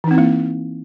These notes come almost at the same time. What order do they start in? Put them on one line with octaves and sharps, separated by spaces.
E3 D#4 C4 E4 A#3